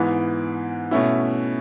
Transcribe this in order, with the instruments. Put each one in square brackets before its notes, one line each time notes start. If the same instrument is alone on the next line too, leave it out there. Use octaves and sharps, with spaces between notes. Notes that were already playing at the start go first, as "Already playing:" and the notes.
Already playing: [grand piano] G#2 E3 B3
B2 A3 C#4 E4